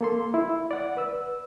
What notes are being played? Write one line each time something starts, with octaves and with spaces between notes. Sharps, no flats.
A#3 A4 C6
E4
D5 F#5
B4 E6